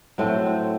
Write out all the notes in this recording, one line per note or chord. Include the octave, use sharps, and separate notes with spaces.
A2 F#3 A3 C4
C4